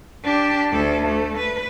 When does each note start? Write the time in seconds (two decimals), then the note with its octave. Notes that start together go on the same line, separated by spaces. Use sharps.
0.24 D4 G4
0.71 D2 A4
1.06 A3
1.38 B4